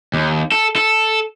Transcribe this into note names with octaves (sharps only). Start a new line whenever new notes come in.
D#2
A4
A4